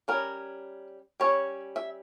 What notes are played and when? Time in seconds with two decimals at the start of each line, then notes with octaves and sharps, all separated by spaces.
0.08 G3 C#4 A#4
1.20 G3 C#4 C#5
1.76 E5